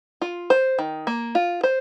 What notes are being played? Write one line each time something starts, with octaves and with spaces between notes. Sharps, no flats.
F4
C5
D#3
A#3
F4
C5